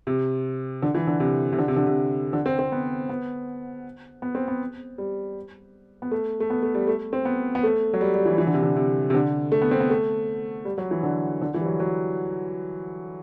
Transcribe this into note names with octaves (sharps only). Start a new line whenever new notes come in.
C3
D3
E3
D3
C3
C3
D3
C3
D3
C3
D3
C4
C4
B3
B3
B3
C4
B3
G3
B3
A3
A3
B3
A3
G3
A3
C4
B3
B3
A3
F#3
G3
G3
E3
E3
D3
C3
D3
C3
C3
D3
A3
B3
C4
B3
A3
G3
F#3
E3
D3
D3
E3
G3
F#3
F#3